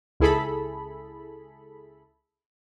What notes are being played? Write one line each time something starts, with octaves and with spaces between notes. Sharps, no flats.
C#2 E4 G#4 A4 B5